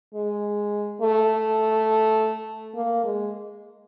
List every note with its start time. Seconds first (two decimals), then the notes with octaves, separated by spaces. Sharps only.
0.14 G#3
1.01 A3
2.75 A#3
3.04 G#3